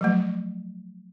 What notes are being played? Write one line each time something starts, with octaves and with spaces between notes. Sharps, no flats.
F3 F#3 A3